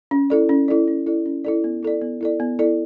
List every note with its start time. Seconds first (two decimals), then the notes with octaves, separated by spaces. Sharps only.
0.11 C#4
0.30 E4 A4 D5
0.49 C#4
0.68 E4 A4 D5
0.88 C#4
1.07 E4 A4 D5
1.26 C#4
1.44 E4 A4 D5
1.64 B3
1.83 E4 A4 D5
2.01 B3
2.21 E4 A4 D5
2.40 B3
2.59 E4 A4 D5